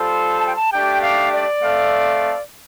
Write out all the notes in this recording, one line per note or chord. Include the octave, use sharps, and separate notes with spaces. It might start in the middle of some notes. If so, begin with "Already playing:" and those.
Already playing: G3 F4 A4 C5
A5
G5
A5
A3 D4 G4 G5
F5
D5
A3 C4 A4 F5